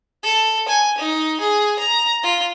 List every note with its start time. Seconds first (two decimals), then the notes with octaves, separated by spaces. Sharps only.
0.23 A4
0.68 G#5
0.98 D#4
1.40 G#4
1.79 A#5
2.23 F4